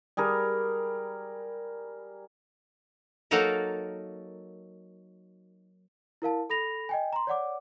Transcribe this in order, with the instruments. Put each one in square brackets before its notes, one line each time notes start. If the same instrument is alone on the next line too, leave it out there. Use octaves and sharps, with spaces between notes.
[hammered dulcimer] G3 G#4 A#4
[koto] F#3 A#3 D#4 F#4 A4 A#4
[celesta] E4 A#4 F5 A5
A4 B5 A#6 F7
D#5 G5 G#5
A#5 C6
C#5 D5 F#5 D6